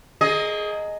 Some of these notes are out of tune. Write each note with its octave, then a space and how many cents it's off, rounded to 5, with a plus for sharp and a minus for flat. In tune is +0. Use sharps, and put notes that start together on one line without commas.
A#3 -20 G#4 +15 D#5 +0